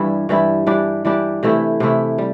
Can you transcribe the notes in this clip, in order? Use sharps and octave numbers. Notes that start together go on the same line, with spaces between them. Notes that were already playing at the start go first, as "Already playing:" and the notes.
Already playing: G2 E3 G3 E4
G2 E3 G3 E4
E3 G3 D4 G4
E3 G3 D4 G4
C3 E3 A3 E4
C3 E3 A3 E4
G3